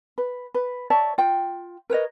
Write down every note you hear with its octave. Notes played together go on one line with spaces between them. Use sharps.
B4
B4
C#5 D5 E5 A5
F4 G5
A#4 B4 C#5 D#5